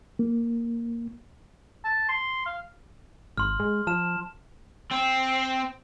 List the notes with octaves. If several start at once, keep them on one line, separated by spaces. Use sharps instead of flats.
A#3
A5
C6
F5
G#1 C6 F6
G#3
F3 A5 F6 E7
C4